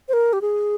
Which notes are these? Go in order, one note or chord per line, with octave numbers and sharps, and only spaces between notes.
C5
A#4
G4
G#4